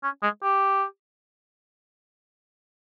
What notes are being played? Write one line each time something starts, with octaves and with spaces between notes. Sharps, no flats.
C#4
G#3
G4